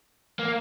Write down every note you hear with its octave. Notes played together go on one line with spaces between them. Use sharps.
A#3